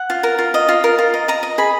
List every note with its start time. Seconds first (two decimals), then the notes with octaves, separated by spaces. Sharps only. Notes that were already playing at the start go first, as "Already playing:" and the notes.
Already playing: F#5
0.10 F4
0.23 A#4
0.39 F4
0.54 D#5
0.69 F4
0.84 A#4
0.98 F4
1.14 D#5
1.28 D#5 A#5
1.43 D#5
1.58 G#4 B5